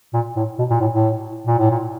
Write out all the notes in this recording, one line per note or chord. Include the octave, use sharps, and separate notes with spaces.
A#2
A2
B2
A#2
A2
A2
A#2
A2
A#2